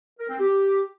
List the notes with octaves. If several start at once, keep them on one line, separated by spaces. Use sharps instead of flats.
A#4
C4
G4